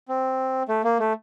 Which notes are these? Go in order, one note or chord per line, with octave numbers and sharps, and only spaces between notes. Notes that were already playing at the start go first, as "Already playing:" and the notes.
C4
A3
A#3
A3